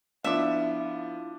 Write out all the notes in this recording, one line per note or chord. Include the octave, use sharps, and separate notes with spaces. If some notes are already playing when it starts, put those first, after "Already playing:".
F3 B3 D4 E4 F4 E5 F5 D6